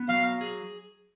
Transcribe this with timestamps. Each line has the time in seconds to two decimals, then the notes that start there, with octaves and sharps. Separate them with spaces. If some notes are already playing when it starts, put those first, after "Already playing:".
Already playing: B3
0.09 F#3 F5
0.41 G#4